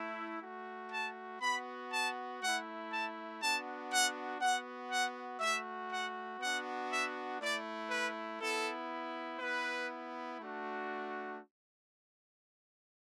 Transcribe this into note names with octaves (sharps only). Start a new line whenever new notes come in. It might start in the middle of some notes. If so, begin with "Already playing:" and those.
Already playing: A3 E4
A3 F#4
A5
B3 F#4 B5
A5
A3 E4 F#5
A5
B3 D4 F#4 A5
F#5
B3 F#4 F#5
F#5
A3 F#4 E5
F#5
B3 D4 F#4 F#5
E5
A3 E4 D5
B4
B3 E4 A4
B3 E4 B4
A3 D4 F#4